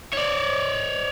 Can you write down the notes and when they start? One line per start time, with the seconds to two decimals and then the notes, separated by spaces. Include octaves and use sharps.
0.13 C#5 D5